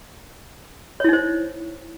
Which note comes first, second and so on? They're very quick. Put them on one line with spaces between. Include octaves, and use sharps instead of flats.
C#5 E4 D#4 C5